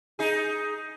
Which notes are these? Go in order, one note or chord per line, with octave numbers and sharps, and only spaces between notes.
D#4 G#4